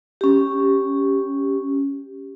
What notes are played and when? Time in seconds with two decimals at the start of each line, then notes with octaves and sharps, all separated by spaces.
0.21 C#4 G4